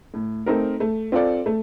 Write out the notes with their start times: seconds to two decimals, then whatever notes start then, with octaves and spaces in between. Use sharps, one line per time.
0.14 A2
0.46 A3 C4 D#4 A#4
0.80 A3
1.12 C4 F4 A4 D5
1.46 A3